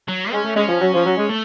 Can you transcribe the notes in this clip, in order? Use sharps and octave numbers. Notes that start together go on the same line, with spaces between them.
F#3
G#3 C#4
A3
G#3 C#4
F3
F#3
F3
F#3
G#3
A3